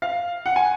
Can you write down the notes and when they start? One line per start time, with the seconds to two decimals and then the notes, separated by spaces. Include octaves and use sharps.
0.02 F5
0.46 F#5
0.56 G#5